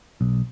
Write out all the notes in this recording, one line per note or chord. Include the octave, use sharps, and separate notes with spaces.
B1